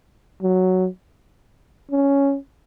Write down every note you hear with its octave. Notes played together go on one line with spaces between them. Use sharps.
F#3
C#4